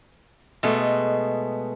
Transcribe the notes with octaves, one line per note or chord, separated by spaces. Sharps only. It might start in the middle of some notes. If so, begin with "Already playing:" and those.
B2 G#3 A3